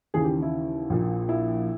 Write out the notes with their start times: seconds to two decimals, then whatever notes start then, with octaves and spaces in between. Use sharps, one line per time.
0.14 D#2 C#3 E3 G#4
0.24 G4
0.42 E4
0.90 A#1 A#2
1.29 E4